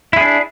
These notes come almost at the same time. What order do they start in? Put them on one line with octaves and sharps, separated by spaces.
E4 G#4 D4